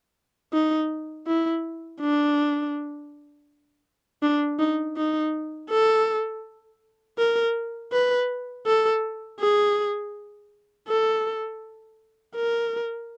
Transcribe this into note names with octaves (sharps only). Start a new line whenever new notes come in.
D#4
E4
D4
D4
D#4
D#4
A4
A#4
B4
A4
G#4
A4
A#4